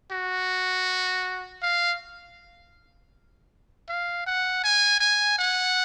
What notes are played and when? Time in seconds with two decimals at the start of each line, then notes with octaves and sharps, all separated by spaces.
0.12 F#4
1.62 F5
3.89 F5
4.26 F#5
4.64 G#5
5.00 G#5
5.39 F#5